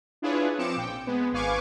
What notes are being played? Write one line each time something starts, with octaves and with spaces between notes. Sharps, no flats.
D4 E4 F4 G#4 B4 C#5
F3 C4 D6 C#7 E7
A#1 G5
G#3 B3
G#1 B4 F5 G#5 C#6 D6